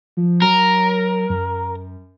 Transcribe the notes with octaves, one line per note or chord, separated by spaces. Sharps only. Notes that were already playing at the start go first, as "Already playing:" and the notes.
F3
F#3 A#4
F#2